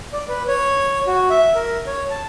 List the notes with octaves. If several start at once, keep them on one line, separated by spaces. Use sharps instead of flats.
D5
B4
C#5
F#4
E5
A#4
C#5
A5